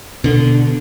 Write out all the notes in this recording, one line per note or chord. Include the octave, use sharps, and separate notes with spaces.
B2 D3